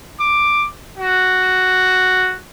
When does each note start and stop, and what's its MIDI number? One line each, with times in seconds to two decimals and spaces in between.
0.20 0.67 86
0.97 2.37 66